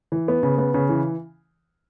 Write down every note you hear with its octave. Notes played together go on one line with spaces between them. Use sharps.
E3
B3
C#3
B3
C#3
E3